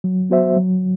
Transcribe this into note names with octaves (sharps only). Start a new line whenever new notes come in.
F#3
B3 F#4 C5 E5
F#3